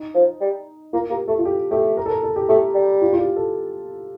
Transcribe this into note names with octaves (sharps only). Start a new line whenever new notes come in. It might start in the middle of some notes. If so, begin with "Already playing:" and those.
Already playing: D#4
F3
G3
A#3 F4
A#3 G4
A3 A4
F4
G4
A3 G4
A#4
A4
A#4
A4
G4
A3 G4
G3
F4
F4
G4
A4